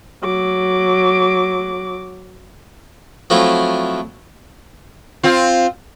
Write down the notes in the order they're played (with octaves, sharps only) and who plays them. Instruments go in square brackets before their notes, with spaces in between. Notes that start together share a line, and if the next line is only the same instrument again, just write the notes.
[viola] F#3 D6
[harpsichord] F3 F#3 A3 C4 E4 F4
[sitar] C4 F4